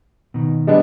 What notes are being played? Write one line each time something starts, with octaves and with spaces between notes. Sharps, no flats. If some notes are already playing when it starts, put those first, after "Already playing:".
B2 D#3
G3 G#3 B3 D4